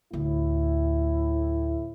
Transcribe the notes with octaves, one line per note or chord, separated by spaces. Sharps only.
D2 A2 E4